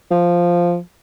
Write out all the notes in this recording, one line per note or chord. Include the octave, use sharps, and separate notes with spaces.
F3